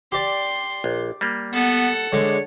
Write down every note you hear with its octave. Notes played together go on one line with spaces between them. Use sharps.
G4 D5 C6
A#1
G3 A#3
B3 A4 F#5
D3 G#3 C#5